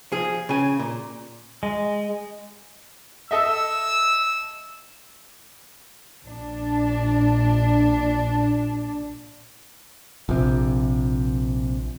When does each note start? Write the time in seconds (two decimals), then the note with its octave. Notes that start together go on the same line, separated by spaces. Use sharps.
0.12 F3 G#4
0.49 C#3 G#5
0.79 A#2
1.63 G#3
3.31 A4 D#5 E5 E6
6.25 A#1 D4
10.29 A#1 C3